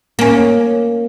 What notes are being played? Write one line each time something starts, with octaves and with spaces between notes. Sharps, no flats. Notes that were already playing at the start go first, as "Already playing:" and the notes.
A#3 C#4